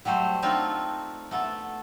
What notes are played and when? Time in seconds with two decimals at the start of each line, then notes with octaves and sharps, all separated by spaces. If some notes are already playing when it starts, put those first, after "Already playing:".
0.05 F#3 G3 A3 C5
0.42 A3 C4 D4 D#4 F4
1.31 A3 B3 A4